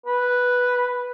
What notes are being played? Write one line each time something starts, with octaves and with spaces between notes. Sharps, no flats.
B4